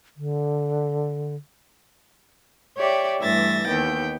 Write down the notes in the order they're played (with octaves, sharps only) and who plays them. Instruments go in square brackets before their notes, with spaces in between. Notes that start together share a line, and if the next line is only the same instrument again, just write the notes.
[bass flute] D3
[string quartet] G4 C#5 D5 E5 G5
G2 E3 A3 E5 A6 A#6
D#2 B3 G5